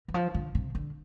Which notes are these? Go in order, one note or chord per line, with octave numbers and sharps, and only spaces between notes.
E3
F3
D3
C3
D3